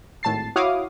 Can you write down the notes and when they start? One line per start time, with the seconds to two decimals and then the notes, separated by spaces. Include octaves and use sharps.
0.23 G#1 A2 A5 A6 C7
0.56 E4 F#4 C#5 F5 D6 D#6